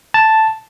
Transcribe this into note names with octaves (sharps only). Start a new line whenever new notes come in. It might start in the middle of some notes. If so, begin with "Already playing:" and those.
A5